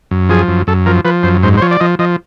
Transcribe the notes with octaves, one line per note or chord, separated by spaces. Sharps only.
F#2
F3 G#4
F#2
F#2 A4
F3 A#4
F3 B4
F#2 C5
G#2 C5
C5
F3 C#5
D5
F3 D#5
F3 D#5